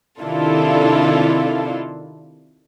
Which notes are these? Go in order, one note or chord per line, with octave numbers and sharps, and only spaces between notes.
C3 D#3 D4 E4 F4 A4